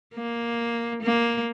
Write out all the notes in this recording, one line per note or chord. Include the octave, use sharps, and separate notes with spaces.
A#3
A#3